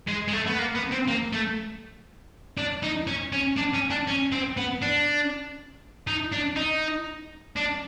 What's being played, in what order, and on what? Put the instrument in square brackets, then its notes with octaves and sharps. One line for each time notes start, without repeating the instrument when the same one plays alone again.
[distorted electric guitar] G#3
G#3
A3
B3
A#3
B3
C4
A#3
A3
D4
D#4
C#4
C#4
D4
C#4
D4
C#4
C4
B3
D4
D#4
D4
D#4
D4